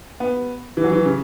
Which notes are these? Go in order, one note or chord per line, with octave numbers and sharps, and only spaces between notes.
B3
E3
F#3
E3
C#3